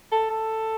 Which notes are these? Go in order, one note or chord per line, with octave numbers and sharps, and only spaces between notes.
A4
A4